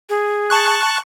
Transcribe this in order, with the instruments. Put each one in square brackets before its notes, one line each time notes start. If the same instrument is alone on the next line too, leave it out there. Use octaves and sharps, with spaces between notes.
[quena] G#4
[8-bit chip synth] A5 C#6 F#6